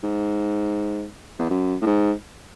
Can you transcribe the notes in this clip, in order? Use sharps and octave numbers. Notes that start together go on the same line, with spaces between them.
G#2
E2
F#2
A2
G#2